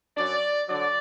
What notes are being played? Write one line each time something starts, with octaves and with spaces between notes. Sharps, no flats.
F#2 F#3 D5
D3 F#3 D5